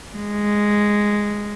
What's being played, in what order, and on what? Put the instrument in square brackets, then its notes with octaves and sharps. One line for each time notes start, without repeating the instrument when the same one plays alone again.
[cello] G#3